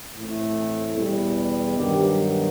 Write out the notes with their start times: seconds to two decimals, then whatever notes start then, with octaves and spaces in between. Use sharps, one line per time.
0.17 A2 E3 A3 C4
0.97 E2 B2 G3
1.78 G2 D#3 F#3 B3 G4